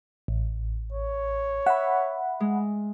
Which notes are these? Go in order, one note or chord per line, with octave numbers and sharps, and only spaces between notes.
A1
C#5
E5 F#5 B5
G#3